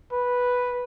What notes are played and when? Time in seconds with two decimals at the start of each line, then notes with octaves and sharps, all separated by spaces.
0.12 B4